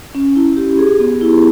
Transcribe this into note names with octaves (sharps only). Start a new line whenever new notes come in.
C#4
E4
G4
G#4
B3
E4